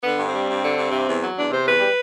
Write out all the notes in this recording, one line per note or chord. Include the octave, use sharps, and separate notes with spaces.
D3 B3
G2
C4
G3
G2
D3
G2
C3
E2
F#3
E2 D4
C3 C5
E2 B4
G3